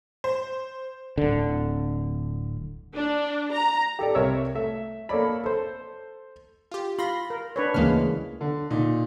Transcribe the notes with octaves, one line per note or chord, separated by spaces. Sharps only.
C5
D1 D3
D4
A#5
G4 A4 D5
C2 A#4 C#5 E5 E6
A3 E5
A#3 A4 C#5 D5 B5
A4 C5
F4 G4
F4 B5 C6 A#6
A#4
D4 B4 C#5
D2 C#3 E3 G#3 A#3 F6
D3
A#2 D#4